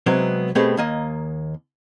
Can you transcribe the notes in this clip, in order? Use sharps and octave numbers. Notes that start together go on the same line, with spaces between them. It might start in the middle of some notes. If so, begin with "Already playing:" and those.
C3 F#3 G#3 B3 C4
B2 A3 B3 C4 G4 G#4
D#2 A#3 D#5